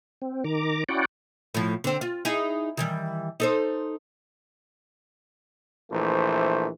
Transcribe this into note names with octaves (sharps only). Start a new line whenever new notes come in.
C4
D#3 A#5 D6
C#4 E4 F#4 D5 F#5 G5
A2 F3
D3 C4
F4
D#4 E4 G#4
D#3 E3 G3
D#4 A4 C5
A#1 E3 A3 C5